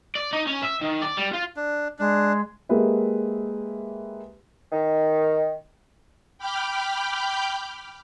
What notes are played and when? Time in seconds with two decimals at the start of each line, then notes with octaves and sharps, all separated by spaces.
0.15 D5
0.33 D#4
0.47 C#4
0.62 E5
0.82 D#3
1.02 D5
1.17 G3
1.34 F4
1.56 D4
1.99 G#3 D4
2.69 G#3 A#3 G4 G#4 B4 E5
4.71 D#3
6.38 G5 B5 D6 F6 G6